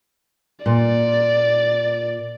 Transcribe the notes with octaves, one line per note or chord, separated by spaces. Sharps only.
A#2 D5